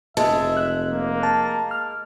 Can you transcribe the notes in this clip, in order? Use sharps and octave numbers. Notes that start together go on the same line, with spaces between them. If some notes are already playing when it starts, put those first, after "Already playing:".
F1 G#3 E5 A5
F#6
A#3
A5
F6